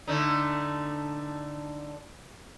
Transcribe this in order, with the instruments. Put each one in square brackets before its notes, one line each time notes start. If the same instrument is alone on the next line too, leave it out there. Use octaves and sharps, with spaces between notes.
[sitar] D3 A3 D#4